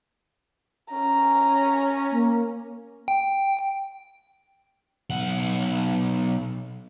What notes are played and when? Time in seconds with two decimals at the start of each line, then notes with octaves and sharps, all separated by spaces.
0.92 C#4 A#5
2.12 A#3
3.08 G5
5.10 B1 F#5